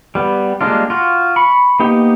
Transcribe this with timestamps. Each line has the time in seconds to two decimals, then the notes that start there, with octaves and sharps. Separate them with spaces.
0.15 G3 B3
0.61 G3 G#3 A#3 D4 F4
0.90 F4 F#4
1.36 B5 C#6
1.80 A#3 B3 D#4 G4